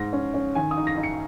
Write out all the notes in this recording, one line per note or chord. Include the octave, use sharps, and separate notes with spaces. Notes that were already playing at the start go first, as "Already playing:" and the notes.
Already playing: G#2 A#6
C#4
C#4
D#3 G#5
D#6
D#4
A#6
D#4
C#7